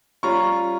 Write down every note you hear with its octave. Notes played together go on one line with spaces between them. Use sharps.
G3 C#4 F4 A#5 C#6